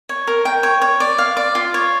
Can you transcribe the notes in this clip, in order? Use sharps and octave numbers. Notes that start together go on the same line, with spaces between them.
C#5
A#4
G5
C#5
C#5
D5
F5
D5
F4
C#5